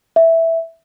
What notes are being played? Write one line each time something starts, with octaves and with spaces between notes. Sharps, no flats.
E5